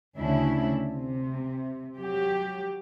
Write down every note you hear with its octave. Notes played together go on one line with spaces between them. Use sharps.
D2 C#3 D4 E4
C3
F#3 G4